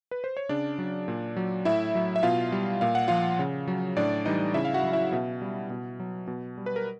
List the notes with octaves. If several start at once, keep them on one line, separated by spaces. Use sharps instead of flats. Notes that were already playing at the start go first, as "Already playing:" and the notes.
B4
C5
C#5
C#3 D4 D5
F#3
A#2
F#3
A2 E4 E5
F#3
E5
B2 F4 F5
G3
A#2 F5
F#5
F3 F4 F5
C#3
F#3
A2 D4 D5
E3 G3 D#4 D#5
C#3 E4 E5
F5
F#4 F#5
F#3
E4 E5
B2
G3
B2
F#3
B2
G3
B4
A#4